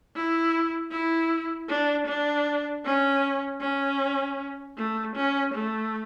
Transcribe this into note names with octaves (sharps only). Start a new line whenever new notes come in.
E4
E4
D4
D4
C#4
C#4
A3
C#4
A3